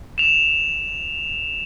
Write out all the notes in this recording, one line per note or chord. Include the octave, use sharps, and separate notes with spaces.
E7 F7